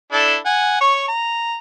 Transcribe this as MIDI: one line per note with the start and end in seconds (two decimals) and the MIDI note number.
0.12 0.37 62
0.12 0.37 64
0.12 0.37 69
0.46 0.80 78
0.46 0.80 80
0.81 1.07 73
0.81 1.07 85
1.08 1.59 82